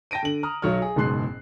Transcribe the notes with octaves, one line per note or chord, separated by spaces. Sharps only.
G5 A5 A#6 D7 D#7
D3 F#7
A#5 D#6 F6
B1 F#3 C#5 F6
G#4
F#1 G#2 B2 C6 F#6 C7